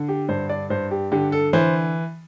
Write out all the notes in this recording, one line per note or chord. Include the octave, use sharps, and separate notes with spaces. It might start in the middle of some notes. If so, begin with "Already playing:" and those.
Already playing: D3
G4
G2 C5
D5
G2 C5
G4
D3 G4
A4
E3 C5